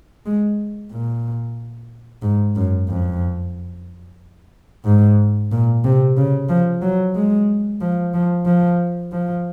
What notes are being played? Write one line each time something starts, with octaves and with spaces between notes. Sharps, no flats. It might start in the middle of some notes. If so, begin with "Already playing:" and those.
G#3
A#2
G#2
F#2
F2
G#2
A#2
C3
C#3
F3
F#3
G#3
F3
F3
F3
F3